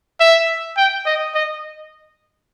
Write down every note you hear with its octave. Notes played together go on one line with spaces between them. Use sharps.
E5
G5
D#5
D#5